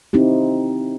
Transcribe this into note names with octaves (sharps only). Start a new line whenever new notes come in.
C4 D#4 E4 G4